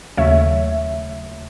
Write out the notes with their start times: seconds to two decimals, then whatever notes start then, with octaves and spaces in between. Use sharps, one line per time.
0.17 D#2 C#3 F#3 A3 C#5 E5